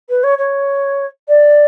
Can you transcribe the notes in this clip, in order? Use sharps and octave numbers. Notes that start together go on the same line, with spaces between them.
B4
C#5
C#5
D5